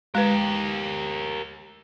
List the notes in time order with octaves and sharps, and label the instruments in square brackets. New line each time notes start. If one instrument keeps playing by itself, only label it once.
[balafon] G#3 B4 [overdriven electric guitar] G4 A#4